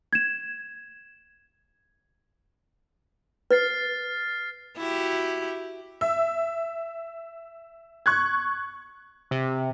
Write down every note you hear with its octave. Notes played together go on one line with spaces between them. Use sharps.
G#6 E7
B4 F6 A6 C7
E4 F#4 G4
E5
C#6 F#6 G#6
C3